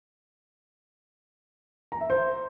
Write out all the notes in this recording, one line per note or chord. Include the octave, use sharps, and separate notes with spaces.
A#5
E5
C5